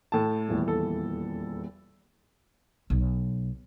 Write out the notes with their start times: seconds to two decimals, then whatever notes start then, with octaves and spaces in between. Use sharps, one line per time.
0.12 A2 A5
0.49 D#1 E2 E3
0.68 A4
2.90 B1